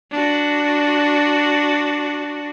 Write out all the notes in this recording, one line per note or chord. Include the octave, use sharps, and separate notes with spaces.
D4 F#4